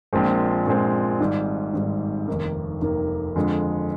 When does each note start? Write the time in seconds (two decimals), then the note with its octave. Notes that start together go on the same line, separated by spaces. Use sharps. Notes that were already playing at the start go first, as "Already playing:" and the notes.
0.13 A#1 A#2 G#3 C4
0.66 A#1 A#2 G#3 C4
1.20 G#1 G#2 G3
1.73 G#1 G#2 G3
2.28 F1 D#2 D#3 A#3
2.81 F1 D#2 D#3 A#3
3.36 F2 D3 G#3